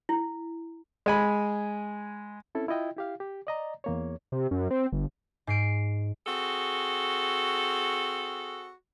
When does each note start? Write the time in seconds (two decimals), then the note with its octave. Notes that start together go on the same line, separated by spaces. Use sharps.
0.09 E4
1.06 G#3 G#5 B5
2.55 C4 C#4 E4 A4
2.68 E4 F4 D#5 G5
2.96 E4 G4 F5
3.20 G4
3.47 D5 D#5 A#5
3.84 E2 A#3 C#5
4.32 C3
4.51 F#2
4.71 C4
4.92 G1
5.47 G#2 C7 D7
6.26 C4 F#4 G#4 A4